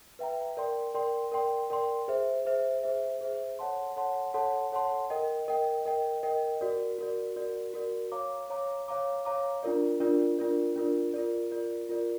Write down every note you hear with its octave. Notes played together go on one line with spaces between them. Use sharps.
B4 E5 G5 A#5
A#4 D5 G5 C6
A#4 D5 G5 C6
A#4 D5 G5 C6
A#4 D5 G5 C6
G#4 C5 E5
G#4 C5 E5
G#4 C5 E5
G#4 C5 E5
A4 C#5 F#5 A5 C6
A4 C#5 F#5 A5 C6
A4 C#5 F#5 A5 C6
A4 C#5 F#5 A5 C6
A#4 D#5 G5
A#4 D#5 G5
A#4 D#5 G5
A#4 D#5 G5
F#4 A#4 D5
F#4 A#4 D5
F#4 A#4 D5
F#4 A#4 D5
C#5 F5 A#5 D6
C#5 F5 A#5 D6
C#5 F5 A#5 D6
C#5 F5 A#5 D6
D4 F4 A#4 D5
D4 F4 A#4 D5
D4 F4 A#4 D5
D4 F4 A#4 D5
F4 A#4 D5
F4 A#4 D5
F4 A#4 D5